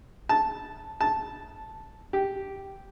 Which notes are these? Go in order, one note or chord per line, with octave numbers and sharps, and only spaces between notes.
A5
A5
G4